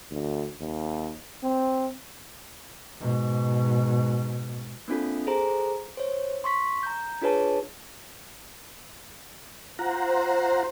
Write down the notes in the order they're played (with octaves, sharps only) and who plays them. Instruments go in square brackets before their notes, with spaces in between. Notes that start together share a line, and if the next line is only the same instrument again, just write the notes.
[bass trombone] D2
D#2
C4
[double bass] G#2 B2
[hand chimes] A#3 C4 D4 F4 A4
G#4 A4 C5 A#5
C5 C#5
C6 C#6 B6
A#5 G6
D4 F4 G#4 B4 C#5 A5
[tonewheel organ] F4 F#5 A#5 [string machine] C5